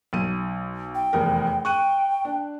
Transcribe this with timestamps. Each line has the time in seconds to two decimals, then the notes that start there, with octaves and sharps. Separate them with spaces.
0.13 B1 D#7
0.95 G5
1.13 F1 E2 A#4
1.65 G5 C#6 F#6 D#7
2.25 D4